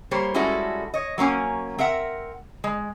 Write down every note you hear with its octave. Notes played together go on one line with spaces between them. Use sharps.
G3 A#3 G4 C5 C#5
G3 G#3 C#4 E4 F#4 A4
C#5 D#5
F#3 A#3 C#4 G#5
C4 A#4 E5 F#5
G#3